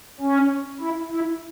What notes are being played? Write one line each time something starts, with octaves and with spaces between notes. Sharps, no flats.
C#4
E4
E4